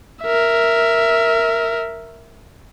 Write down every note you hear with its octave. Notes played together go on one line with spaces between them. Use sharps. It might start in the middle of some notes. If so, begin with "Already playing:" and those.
A#4 E5